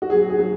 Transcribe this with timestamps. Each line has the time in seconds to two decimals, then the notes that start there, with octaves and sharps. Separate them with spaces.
0.02 F#4
0.10 F#3 G#4
0.30 G#4
0.39 F#3